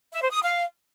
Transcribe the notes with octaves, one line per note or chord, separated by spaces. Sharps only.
E5
C5
D#6
F5